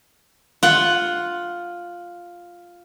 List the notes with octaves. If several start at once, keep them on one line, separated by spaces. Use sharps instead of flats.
F4 F#5